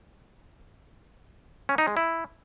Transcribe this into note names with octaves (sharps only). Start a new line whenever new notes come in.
C#4
D#4
G#3
E4